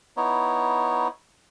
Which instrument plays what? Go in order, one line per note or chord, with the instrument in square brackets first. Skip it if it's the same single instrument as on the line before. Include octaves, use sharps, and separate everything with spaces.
[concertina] B3 D#4 E4 C#5